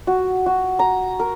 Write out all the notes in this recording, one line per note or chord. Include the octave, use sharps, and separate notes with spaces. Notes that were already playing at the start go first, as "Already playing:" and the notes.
F#4
F#4
A#5
A#4